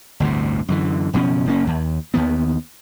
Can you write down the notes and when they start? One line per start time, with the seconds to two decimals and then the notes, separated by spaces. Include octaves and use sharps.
0.20 G1 D2 A2 C3
0.68 F#2 D3 E3
1.13 F#1 B2 F3 C#4
1.46 F#1 A#3 C#4
1.67 D#2
2.14 D#2 D#3 B3